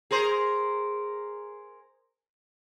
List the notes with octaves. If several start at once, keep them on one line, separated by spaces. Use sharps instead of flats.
G#4 A#4 C5